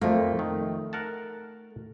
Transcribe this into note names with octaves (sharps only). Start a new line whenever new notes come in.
F2 F3 A3 A#3
D#3
A#4 F#5 A5